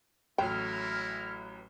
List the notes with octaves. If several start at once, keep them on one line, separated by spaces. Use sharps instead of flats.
A1 A2 F#3 G#3 E4 G5 F6